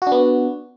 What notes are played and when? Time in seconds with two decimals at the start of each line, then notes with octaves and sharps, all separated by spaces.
0.02 F#4
0.07 D4
0.12 B3